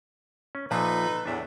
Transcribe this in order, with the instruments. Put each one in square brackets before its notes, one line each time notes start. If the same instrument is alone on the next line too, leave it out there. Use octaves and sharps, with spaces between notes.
[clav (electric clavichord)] C#4
[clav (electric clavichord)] A#2 F3 E5 [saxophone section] D#4 A4 B4
[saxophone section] E2 A2 [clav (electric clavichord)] D4 E5